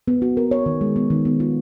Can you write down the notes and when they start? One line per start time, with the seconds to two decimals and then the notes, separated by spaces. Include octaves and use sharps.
0.08 B3
0.22 F#4
0.37 A#4
0.51 C#5
0.66 D#3
0.81 G#3
0.96 B3
1.10 D#3
1.25 B3
1.40 F4